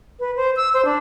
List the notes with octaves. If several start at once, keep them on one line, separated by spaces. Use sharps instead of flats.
B4
C5
E6
C5
D4